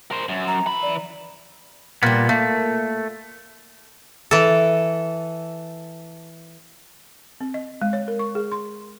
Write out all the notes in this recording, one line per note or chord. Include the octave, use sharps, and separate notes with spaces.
A#4 C5
F#2
A#5
E3 B5
D5
A#2 G3 A#3 B3
A3 A#3
E3 A4
C4
D#5
G#3
C#5
A#4
C#6
G#4
C6